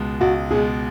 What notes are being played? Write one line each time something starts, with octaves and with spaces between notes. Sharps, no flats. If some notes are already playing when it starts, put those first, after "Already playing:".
Already playing: C#2 B2 G#3
C#2 F#4
B2 G#3 G#4